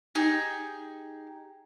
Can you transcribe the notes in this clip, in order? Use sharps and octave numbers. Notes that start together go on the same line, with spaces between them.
D#4 G4 G#4